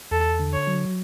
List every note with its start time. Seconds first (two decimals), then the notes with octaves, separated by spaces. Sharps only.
0.11 E2 A4
0.39 D3
0.54 C#5
0.67 F#3